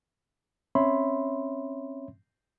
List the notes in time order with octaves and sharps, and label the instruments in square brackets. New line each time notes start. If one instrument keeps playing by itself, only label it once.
[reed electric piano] C4 C#4 C#5 E5 B5 C6